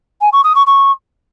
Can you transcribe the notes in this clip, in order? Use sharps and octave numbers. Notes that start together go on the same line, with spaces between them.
G#5
C#6
D#6
C#6
C#6